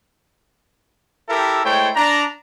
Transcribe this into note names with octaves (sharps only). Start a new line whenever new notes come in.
E4 G4 A4 A#4 E5
G#3 A3 E4 C5 C#5 G5
D4 A#5